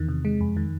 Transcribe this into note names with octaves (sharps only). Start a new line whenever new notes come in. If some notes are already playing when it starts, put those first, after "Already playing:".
Already playing: E2 D#3
C3
G#3
F2
D#3